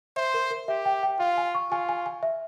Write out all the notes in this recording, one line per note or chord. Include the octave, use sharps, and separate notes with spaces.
C5 E5
A#4
A#4
G4 E5
G5
G5
F4 F5
G#5
C#6
F4 G#5
G#5
G#5
E5